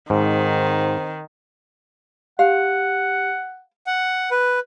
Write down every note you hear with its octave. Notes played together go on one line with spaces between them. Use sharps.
G#2 D#3 C4
G4 F5 F#5
F#5
B4